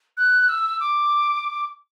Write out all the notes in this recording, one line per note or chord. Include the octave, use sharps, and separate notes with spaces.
F#6
E6
D6